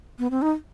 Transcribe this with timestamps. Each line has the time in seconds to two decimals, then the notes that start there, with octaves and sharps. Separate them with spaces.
0.19 B3
0.31 C4
0.42 D#4